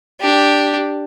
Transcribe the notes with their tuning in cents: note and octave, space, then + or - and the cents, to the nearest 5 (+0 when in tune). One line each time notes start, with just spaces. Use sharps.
D4 +0 G4 +0